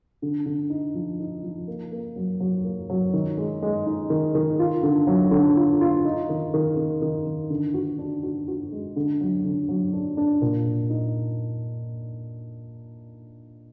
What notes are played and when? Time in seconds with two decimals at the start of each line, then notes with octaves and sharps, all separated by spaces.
0.22 D3
0.46 D3
0.70 D#4
0.94 F3
1.20 D#4
1.43 F3
1.67 A#3
1.92 A#3
2.16 F#3
2.40 F#3
2.64 A#3
2.90 F#3
3.13 D#3
3.38 G#3
3.62 G#3
3.86 D#4
4.10 D#3
4.35 D#3
4.59 F4
4.83 D3
5.07 F#3
5.31 D3
5.56 F4
5.81 F4
6.05 D#4
6.29 D#3
6.54 D#3
6.77 D#3
7.02 D#3
7.26 D#3
7.50 D3
7.74 F#4
7.99 D4
8.23 F#4
8.48 F#4
8.72 G#3
8.96 D3
9.21 F#3
9.45 D3
9.69 F#3
9.93 D4
10.17 D4
10.42 A#2
10.66 A#2
10.90 D#4